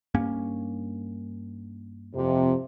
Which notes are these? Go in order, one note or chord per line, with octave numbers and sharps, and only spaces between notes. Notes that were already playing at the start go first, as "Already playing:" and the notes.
G2 A#3 C#4
F2 C3